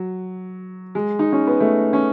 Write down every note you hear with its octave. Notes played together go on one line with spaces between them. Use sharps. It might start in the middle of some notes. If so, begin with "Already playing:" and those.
Already playing: F#3
G#3
D#4
C#4
B3
A3
C#4